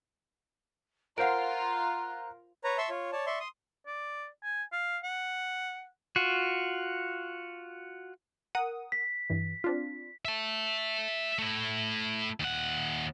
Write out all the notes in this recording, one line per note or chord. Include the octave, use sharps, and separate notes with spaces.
F4 A#4 C5 F5 F#5 A#5 F#6 D7
B4 C#5 A#5
E5 A5 C6 C#6 E6
F4 C#5
C#5 D5 A5
D5 E5 C6 C#6
C6 D#6
D5
G#5
F5
F#5
F4 F#4
A#4 F#5 D#6
B6
G2 E3
C4 D4 F4
E5 A5
A3 E4
D#2 F#5